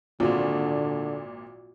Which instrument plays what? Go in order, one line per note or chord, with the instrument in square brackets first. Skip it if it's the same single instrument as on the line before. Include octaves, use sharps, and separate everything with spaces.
[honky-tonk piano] G#1 A#2 [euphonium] D3 [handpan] F4 F#4